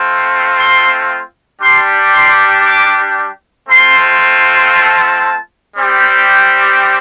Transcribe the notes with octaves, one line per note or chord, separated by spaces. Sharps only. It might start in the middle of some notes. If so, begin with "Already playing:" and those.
Already playing: A3 C4 F4
C6
G3 D4 G4 C6
C6
D6
A3 C4 F4 C6
A5
G3 C4 G4